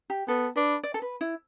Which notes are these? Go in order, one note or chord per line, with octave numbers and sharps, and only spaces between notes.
G4
B3 A4
D4 B4
D5
A4
B4
E4